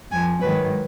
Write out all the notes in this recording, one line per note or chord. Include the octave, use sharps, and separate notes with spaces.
F2 F3 G#5
G#2 D#3 F#3 B4